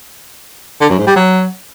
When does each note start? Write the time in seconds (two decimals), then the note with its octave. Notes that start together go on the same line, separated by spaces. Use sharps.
0.81 D3
0.90 F#2
0.98 G#2
1.07 G3
1.16 F#3